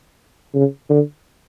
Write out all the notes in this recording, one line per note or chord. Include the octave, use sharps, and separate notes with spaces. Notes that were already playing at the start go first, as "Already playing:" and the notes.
C#3
D3